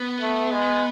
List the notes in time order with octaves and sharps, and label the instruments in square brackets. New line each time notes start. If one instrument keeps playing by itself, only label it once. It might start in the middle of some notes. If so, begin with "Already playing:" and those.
Already playing: [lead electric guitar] B3
[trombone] A3
G#3